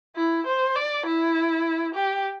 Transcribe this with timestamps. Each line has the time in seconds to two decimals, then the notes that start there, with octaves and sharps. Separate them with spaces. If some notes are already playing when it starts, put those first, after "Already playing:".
0.16 E4
0.46 C5
0.76 D5
1.06 E4
1.94 G4